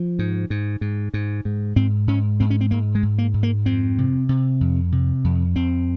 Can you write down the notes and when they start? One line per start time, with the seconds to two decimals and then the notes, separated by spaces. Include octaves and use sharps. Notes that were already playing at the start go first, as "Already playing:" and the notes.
Already playing: F3
0.19 G#2
0.50 G#2
0.81 G#2
1.14 G#2
1.45 G#2
1.76 G#2 C4
2.07 G#2 C#4
2.40 G#2 C4
2.50 C#4
2.61 C4
2.71 G#2 A#3
2.95 G#3
3.03 G#2
3.18 A#3
3.34 G#2
3.43 A#3
3.65 F2 C4
3.98 C3
4.29 C3
4.61 F2
4.92 C3
5.24 F2
5.56 F2 C4